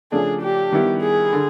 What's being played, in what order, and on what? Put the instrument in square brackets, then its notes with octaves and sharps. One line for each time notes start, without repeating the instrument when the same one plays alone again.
[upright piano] C#3 F3 A3 D4 [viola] G#4
[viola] G4
[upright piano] D#3 G3 B3 E4
[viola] G#4
[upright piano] D3